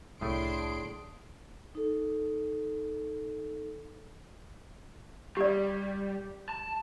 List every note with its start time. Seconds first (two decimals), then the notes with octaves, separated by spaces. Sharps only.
0.21 C2 A2 A3 D4 G#4 C6 D7
1.75 D#4 A4
5.37 G3 G4 D5
6.49 A5